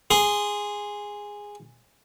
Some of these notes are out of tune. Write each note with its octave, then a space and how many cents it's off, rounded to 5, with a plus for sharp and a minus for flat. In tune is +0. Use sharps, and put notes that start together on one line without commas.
G#4 -10 C6 -5